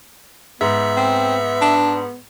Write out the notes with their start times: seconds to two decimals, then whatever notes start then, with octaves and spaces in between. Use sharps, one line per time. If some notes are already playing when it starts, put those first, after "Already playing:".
0.61 G#2 B3 E5
0.97 C4
1.62 D4